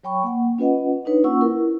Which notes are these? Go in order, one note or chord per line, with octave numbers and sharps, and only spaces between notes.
F#3 C#5 G5 B5 C#6
A#3 F#5
C#4 F4 B4 D#5 F#5
D4 D#4 B4 C#5
A#3 C#4 F4 F#5 C#6 E6
E4 A#4